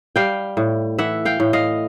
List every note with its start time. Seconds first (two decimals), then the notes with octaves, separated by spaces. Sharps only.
0.16 G3 F5 G5
0.57 A2
0.99 E3 E5 F#5
1.25 F5 G5
1.40 A2
1.53 D#5 F5